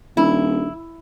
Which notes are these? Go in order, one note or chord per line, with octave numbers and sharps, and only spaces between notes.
D#1 D4 E4